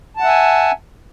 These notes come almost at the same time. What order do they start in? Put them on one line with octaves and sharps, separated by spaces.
A5 F#5 E5 G#5